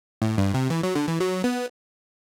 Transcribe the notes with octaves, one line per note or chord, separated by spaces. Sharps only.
A2
G2
C3
E3
F#3
D3
E3
F#3
B3